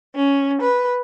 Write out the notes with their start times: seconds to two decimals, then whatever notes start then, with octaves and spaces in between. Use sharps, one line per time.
0.15 C#4
0.60 B4